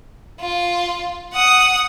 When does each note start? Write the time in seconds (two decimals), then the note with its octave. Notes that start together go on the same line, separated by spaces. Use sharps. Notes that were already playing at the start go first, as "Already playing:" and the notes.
0.41 F4
1.34 F#5 D#6